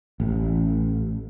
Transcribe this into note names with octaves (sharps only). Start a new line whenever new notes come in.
A1